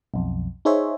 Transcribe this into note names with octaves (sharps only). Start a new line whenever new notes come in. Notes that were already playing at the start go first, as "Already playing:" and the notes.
B1 F2
D#4 G#4 C5 C#5 E5